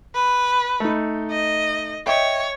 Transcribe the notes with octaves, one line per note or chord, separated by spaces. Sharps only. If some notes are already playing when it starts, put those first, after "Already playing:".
B4
A3 D#4
D#5
C#5 D#5 E5 G5